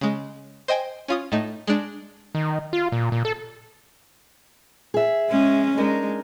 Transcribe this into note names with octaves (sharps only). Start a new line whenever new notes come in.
C#3 G#3
C5 D#5 G5 G#5
C#4 F4 D#6
A2 A3 D#4
G#3 D4
D#3
F4
A#2
A#2
A4
G#4 E5
G#3 C#4
G#3 D4 D#4 A#4